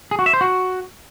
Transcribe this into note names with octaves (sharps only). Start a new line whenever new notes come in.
G#4
F#4
E5
C5
F#4